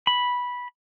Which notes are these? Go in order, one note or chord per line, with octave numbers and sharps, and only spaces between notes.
B5